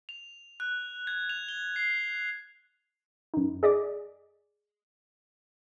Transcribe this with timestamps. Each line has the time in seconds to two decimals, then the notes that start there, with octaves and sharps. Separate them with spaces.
0.09 F7
0.60 F#6
1.07 G#6
1.29 F7
1.49 G7
1.76 C7
3.34 F#2 D#4
3.63 G#4 D5 D#5 D6